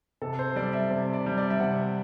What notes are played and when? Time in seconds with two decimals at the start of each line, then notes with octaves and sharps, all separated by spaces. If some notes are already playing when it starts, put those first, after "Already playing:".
0.22 C3 A4
0.39 C5
0.56 G3 D5
0.73 E5
0.90 C3
1.13 D5
1.26 G3
1.38 D5
1.50 E5
1.60 C3 F#5